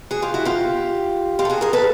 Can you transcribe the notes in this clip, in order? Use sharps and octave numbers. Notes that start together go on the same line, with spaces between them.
F#4 G#4
F4 G4
E4 F#4
F4 G4
F4 G4
A4
F#4 G#4
G#4 A#4
A4 B4